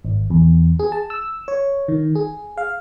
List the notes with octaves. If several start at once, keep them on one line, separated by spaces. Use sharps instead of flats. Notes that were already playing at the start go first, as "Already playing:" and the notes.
G#1
E2
G#4
A5
E6
C#5
D#3
G#4
F5